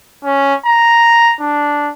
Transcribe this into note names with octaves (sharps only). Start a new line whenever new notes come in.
C#4
A#5
D4